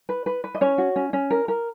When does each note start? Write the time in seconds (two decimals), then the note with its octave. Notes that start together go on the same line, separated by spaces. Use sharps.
0.09 B4
0.26 B4
0.44 B4
0.55 D#5
0.61 C#4 C#5
0.78 F#4
0.96 C#4
1.13 C#4
1.30 A#4
1.48 A#4